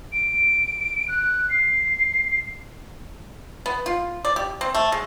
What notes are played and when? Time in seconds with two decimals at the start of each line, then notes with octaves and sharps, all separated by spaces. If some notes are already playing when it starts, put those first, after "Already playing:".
0.12 D7
1.08 F#6
1.50 C7
3.66 B3
3.86 F4
4.25 D5
4.36 G4
4.61 C4
4.75 A3
4.92 G#3